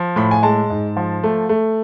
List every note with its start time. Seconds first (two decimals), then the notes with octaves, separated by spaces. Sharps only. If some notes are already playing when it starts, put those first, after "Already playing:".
Already playing: F3
0.16 A2 B5
0.31 G#5
0.43 G#3 A5
0.70 G#2
0.97 F3
1.24 A3
1.49 A3